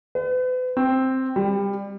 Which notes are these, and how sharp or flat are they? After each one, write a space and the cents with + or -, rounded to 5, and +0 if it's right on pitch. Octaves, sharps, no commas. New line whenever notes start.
B4 +40
C4 +0
G3 +25